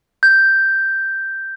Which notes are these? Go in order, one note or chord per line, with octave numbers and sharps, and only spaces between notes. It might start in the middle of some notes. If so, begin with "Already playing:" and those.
G6